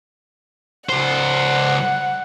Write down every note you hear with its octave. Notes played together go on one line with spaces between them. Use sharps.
C#2 C5 F#5